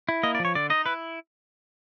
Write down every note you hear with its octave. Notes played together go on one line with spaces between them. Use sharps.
E4
A#3 D#5
D5
F3
C#5
D3 D5
D#4 D#5
E4 B4